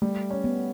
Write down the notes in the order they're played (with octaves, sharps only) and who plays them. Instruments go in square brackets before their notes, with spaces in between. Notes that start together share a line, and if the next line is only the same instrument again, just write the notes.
[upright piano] G3 [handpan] A3
[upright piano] C#4
[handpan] B3